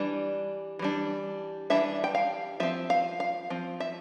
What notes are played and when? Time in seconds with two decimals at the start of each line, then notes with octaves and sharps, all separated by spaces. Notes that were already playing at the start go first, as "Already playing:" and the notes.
Already playing: E3 G3 D4
0.79 E3 G3 D4
1.70 E3 G3 D4 E5
2.04 G5
2.15 F5
2.60 F3 C4 E5
2.90 F5
3.20 F5
3.50 F3 C4
3.80 E5